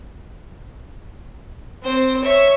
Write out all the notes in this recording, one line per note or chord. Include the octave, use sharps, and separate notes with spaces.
C4 C5
C#5 E5